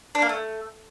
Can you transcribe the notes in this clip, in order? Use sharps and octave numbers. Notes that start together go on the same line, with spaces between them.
D4
A#3
A3